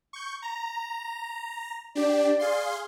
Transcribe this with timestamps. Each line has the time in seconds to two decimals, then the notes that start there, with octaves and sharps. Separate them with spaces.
0.13 C#6 G6
0.42 A#5
1.95 D4 G4 D5
2.39 G#4 F5 C6